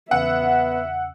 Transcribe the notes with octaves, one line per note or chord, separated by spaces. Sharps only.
E2 C#3 B3 E5 F#5 E6